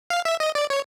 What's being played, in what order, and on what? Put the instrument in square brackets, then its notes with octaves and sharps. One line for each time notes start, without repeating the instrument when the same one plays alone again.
[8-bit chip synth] F5
E5
D#5
D5
C#5